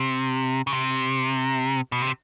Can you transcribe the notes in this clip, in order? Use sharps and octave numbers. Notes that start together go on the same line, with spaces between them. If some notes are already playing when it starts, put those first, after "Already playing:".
Already playing: C3
C#3
C3
B2
C3